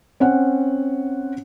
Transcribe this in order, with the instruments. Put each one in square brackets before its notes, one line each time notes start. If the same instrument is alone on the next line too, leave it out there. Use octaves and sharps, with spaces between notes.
[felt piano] C4 C#4 F#5